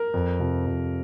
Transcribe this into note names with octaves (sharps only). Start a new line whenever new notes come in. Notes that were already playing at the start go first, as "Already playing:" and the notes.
Already playing: A#4
F2
C3 F3
F2